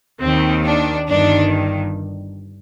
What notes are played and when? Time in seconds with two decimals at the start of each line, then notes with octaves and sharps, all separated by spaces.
0.21 D#2 D#3 C4
0.65 D4
1.08 G1 G2 D#3 D4